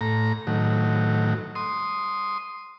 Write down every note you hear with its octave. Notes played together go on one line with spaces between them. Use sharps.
A2 A#5
A2 D#3 F#3
C6 D#6